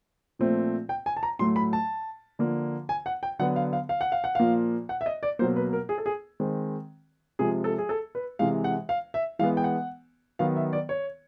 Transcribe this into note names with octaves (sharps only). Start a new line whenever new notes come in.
A#2 F3 A3 C4
G5
G#5
A5
A#5
A2 F#3 A3 C6
B5
A5
D3 F3 A#3
G#5
F#5
G5
D3 F#3 B3 F#5
F5
F5
F5
F#5
F5
F#5
A#2 F3 A#3 F5
F#5
E5
D#5
D5
B2 F#3 A#3 C5
B4
A#4
G#4
A4
G#4
D#3 G#3 C4
C3 F3 G#3 G#4
A4
G#4
A4
B4
C3 E3 G#3 F5
F#5
F5
E5
E3 G#3 B3 F5
G5
F#5
D#3 F#3 B3 F5
E5
D5
C#5